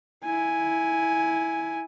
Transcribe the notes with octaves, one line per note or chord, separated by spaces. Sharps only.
E4 G#5